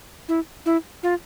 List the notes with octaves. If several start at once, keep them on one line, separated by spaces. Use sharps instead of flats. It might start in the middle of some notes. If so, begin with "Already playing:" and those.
E4
E4
F4